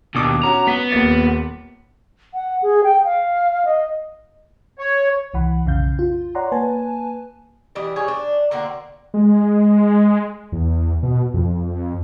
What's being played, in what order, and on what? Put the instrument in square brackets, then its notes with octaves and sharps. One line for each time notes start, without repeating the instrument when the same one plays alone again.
[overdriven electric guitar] D#2 [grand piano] B2 D4 D6
[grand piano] C#4 F#4 [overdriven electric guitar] A#5
[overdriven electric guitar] B3 [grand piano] B6
[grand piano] D#1 A#3 A6
[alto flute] F#5
G#4
G5
F5
D#5
[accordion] C#5
[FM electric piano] C2 E3 F#5 B5
B1 F2 C#3 F5 G6
F4
C#5 D5 F#5 A#5 C6
A#3 B4 G#5 A5
[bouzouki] E3 G3 D#5
G3 G#4 C#5
D4
D3 A#3 C4 F#4
[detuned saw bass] G#3
E2
B2
F2